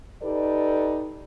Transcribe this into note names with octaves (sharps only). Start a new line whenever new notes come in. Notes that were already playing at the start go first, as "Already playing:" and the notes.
D#4 G4 A4 B4 D5